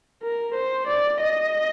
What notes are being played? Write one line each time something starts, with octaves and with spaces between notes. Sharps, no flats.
A#4
C5
D5
D#5